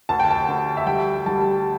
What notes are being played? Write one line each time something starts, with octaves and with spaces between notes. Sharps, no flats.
D2 A5
G5
A5
D2
E5
G3 G5
G3 A5